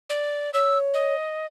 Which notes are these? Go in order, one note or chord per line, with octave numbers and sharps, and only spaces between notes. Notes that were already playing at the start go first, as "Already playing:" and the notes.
D5
C#5 E6
D#5